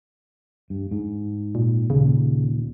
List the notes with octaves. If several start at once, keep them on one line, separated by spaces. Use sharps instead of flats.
G2
G#2
A#2
D#2 A#2 C#3